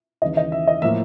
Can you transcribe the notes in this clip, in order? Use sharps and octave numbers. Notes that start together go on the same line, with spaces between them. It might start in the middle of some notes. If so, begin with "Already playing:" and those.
D#2 C#3 E3 D#5
D#5
E5
D#5
A2 F3 A#3 E5